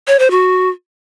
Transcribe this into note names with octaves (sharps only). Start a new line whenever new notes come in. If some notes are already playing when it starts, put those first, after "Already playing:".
C#5
C5
F#4